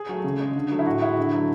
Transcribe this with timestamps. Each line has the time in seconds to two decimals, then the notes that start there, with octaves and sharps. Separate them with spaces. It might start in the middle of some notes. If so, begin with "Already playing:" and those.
Already playing: G#4
0.09 F#3 A3
0.24 C#3
0.39 G#3
0.55 D3
0.71 F#3 A3
0.79 E4
0.87 A2 F#4
1.02 G#3 E4
1.17 D3
1.32 F#3 A3